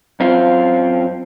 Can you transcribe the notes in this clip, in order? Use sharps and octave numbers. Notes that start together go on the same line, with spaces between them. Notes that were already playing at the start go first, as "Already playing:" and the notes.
F#2 C4 F4